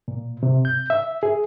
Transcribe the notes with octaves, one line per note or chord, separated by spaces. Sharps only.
A#2
C3
G6
E5
G#4